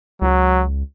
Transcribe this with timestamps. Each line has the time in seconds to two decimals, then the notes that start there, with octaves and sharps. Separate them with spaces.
0.22 C#2 F#3